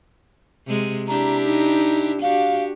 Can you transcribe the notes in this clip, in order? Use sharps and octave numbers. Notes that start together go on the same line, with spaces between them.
C3 G#3
D4 E4 G4 A#5
D#4
D4 F#4 G4 F5